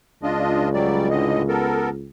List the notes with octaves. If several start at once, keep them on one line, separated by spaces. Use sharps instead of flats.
C#2 D4 F4 D#5
F#3 G3 D5
A2 D3 D#5
B3 A4 A#4